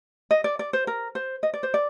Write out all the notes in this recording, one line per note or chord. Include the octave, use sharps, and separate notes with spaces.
D#5
D5
D5
C5
A#4
C5
D#5
D5
C5
D5